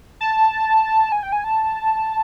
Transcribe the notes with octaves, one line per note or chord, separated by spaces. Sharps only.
A5
G#5
G5
G#5
A5